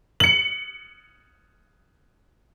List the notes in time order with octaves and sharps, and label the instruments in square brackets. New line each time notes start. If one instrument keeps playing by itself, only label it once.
[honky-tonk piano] C#7 F#7